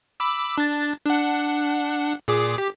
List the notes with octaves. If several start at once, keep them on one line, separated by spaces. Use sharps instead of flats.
B5 D6 E6
D4 A6
D4 F#5
A#2 G#4 D6
G4